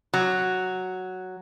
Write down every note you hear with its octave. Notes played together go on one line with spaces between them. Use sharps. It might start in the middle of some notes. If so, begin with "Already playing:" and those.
F#3